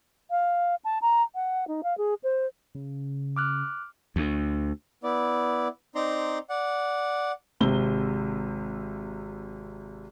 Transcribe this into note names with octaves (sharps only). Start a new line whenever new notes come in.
F5
A5
A#5
F#5
D#4
F5
G#4
C5
C#3
D6 F6 F#6
D2
B3 E4 D5
C4 D#4 D5 A#5 C6
D5 F#5
G#1 C3 G7